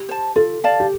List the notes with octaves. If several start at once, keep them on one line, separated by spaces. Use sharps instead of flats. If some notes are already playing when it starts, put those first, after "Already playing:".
Already playing: G4
C5 A5
F4 A4
D5 F5 A5
G4